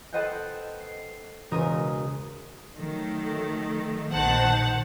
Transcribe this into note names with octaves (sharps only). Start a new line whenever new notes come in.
A4 B4 C5 D#5 F#5 G5
C7
E1 C#3 A#4 D#6
D#3 F#3 A3
A#1 B2 D#3 C5 F#5 A5